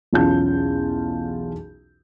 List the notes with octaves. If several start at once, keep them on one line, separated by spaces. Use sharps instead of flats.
B1 E2 C#4 F4 A5 G6